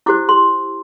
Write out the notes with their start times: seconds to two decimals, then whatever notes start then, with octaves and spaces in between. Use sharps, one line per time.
0.06 E4 G4 C5 D6
0.29 C6